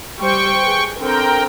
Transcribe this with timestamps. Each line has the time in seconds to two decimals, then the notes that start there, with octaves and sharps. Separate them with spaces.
0.19 G3 C5 G5 C#6
0.62 G#4 B4
0.99 D3 C4 A#4 G5